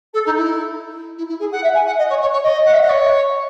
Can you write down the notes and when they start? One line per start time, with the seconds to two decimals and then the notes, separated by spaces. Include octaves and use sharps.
0.14 A4
0.25 D#4
0.36 E4
1.17 E4
1.29 E4
1.40 G#4
1.52 F#5
1.63 E5
1.74 G#5
1.87 F#5
1.98 D#5
2.09 C#5
2.21 C#5
2.33 C#5
2.43 D#5
2.65 F#5
2.73 E5
2.81 D#5
2.89 C#5